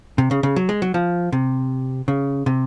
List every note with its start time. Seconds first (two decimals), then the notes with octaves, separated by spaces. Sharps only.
0.18 C3
0.31 C#3
0.43 C#3
0.56 F#3
0.69 G#3
0.82 F#3
0.94 F3
1.32 C3
2.08 C#3
2.46 C3